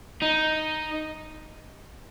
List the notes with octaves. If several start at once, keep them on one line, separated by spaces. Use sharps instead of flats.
D#4